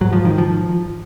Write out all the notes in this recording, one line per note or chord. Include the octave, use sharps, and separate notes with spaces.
G#2 F#3
F3
D#3
F3